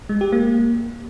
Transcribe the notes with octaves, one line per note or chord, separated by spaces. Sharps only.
G#3
G4
A#3